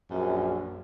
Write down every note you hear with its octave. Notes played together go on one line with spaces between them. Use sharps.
A#1 F#2